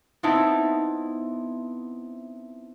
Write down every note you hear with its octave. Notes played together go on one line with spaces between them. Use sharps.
B3 C4 D#4 E4 A5